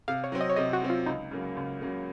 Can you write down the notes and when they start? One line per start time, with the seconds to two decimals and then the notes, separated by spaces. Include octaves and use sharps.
0.08 C3 F5
0.24 C#5
0.32 F#3 C4
0.41 D#5
0.50 C#5
0.56 C3 D#5
0.73 F#4
0.82 F#3 C4
0.90 F4
1.06 C#2 D#4
1.31 C#3 F#3 A#3
1.57 C#2
1.81 C#3 F#3 A#3